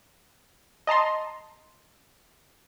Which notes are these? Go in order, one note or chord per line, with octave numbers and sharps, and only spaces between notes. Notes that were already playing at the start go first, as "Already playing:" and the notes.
D#5 A5 A#5 C6